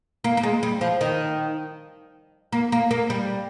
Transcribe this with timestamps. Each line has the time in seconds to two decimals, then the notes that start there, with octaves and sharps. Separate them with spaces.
0.24 A#3
0.37 A#3
0.43 G#3
0.63 G3
0.81 F3
1.01 D#3
2.53 A#3
2.72 A#3
2.91 A#3
3.10 G3